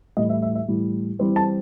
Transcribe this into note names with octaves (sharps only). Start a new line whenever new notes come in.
A2 E3 G3 D#5
E5
E5
E5
A2 E3 G3
E3 G3 C4 C5
A5